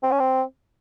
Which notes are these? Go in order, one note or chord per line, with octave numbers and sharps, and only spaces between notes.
C4
C#4
C4